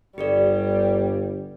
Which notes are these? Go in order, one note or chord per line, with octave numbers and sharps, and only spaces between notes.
G1 G3 G4 A4 D5